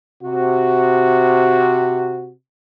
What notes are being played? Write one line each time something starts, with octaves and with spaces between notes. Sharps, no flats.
C3 F#4